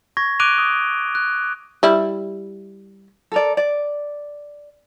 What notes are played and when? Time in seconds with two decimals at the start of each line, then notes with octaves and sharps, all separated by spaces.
0.17 C#6 G#6 A#6
0.39 D6 F#6 D7 D#7 F7 G7
0.58 D#6
1.15 F#6
1.83 G3 E4
3.32 A4 A#4 D5
3.57 D5